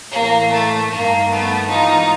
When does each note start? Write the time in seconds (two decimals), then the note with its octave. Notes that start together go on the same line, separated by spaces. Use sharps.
0.11 A2 E3 A#3
0.51 A3
0.90 G2 D#3 A#3
1.29 A3 B3
1.69 G#2 E3 D#4 F4